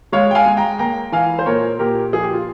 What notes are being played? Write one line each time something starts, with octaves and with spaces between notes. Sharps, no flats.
G#3 C#5 F5
G5
F5 G#5
G#3
G5 A#5
A#3 G5 A#5
E3 F5 G#5
C5
A#2 A#4 C#5
A#2 G4 A#4
F3 G#4
G4
F4